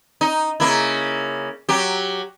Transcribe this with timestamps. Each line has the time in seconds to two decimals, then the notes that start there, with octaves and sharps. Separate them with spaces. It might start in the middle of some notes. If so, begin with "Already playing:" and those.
0.21 D#4
0.60 C#3 A#3 E4
1.69 F#3 G4